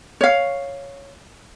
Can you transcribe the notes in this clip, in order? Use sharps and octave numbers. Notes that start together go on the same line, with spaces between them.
C#5 F5